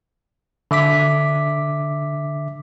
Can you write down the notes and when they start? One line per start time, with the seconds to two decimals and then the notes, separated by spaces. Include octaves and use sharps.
0.71 D3 E5 D6 B6